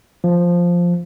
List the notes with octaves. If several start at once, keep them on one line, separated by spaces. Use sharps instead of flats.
F3